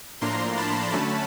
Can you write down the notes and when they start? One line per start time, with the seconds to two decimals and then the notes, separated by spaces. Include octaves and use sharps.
0.21 A2 F3 A#3 D4 A#5 C6
0.57 A5 B5
0.92 D3 F#3 A3 C#4